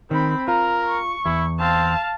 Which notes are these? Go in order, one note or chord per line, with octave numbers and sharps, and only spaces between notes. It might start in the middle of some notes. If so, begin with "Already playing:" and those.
D#3 C4 B5
F4 A#4 A#5
C#6
E2 E4
C4 F5 A5